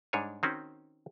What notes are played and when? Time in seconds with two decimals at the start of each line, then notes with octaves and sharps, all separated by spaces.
0.13 G#2 G3 D4 G#4 C#5 G#5
0.43 D#3 C4 C#4 F#4